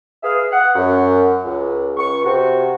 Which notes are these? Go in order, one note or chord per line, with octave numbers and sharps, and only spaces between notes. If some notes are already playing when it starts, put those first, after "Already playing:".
G#4 B4 E5 F5
F#5
F#2
C#2
C#2 C#6
C3 F#4